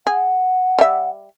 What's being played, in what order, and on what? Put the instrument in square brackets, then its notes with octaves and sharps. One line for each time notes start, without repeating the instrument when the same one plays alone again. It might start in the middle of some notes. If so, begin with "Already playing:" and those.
[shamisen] G#4 [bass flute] F#5
[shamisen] G3 E5